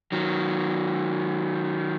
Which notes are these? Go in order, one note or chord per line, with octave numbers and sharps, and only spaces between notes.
D#3 F#3